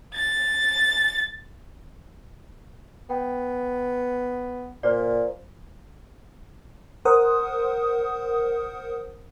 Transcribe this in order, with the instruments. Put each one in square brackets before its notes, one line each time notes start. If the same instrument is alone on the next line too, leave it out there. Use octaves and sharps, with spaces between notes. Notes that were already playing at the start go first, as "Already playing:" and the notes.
[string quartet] A6
[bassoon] B3 [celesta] G5
[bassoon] A#2 [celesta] C5 D5
[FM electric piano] A#4 C5 F#5 D#6